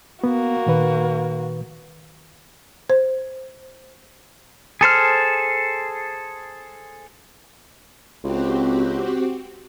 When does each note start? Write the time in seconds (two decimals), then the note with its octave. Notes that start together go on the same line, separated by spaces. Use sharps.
0.24 A#3 B3 F#4
0.66 A#2 D#3 B4
2.90 C5
4.81 G#4 A4 C5 F6
8.24 C#2 C4 F#4 G4